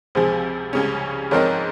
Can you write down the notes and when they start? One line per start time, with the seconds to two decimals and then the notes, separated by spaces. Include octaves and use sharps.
0.15 C#2 C3 F3 G#4 C5
0.73 C#2 C#3 G3 C#4
1.31 G#2 F3 C4 D#4 A#4 C#5